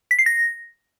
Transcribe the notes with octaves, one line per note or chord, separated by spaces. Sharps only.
B6
C7
A#6